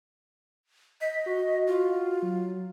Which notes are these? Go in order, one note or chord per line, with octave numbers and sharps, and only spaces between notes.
D#5 B6
F#4
F4
F#3